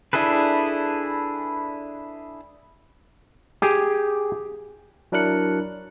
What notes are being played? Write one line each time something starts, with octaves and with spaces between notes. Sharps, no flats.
D4 E4 G#4 A4 B4
G4 G#4
F#3 D4 E4 A#4 F#6 C#7